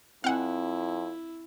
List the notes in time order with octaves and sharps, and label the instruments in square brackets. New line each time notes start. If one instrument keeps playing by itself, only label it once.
[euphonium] F2 [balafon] C4 G#5 [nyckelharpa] E4 [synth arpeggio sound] F5 F#5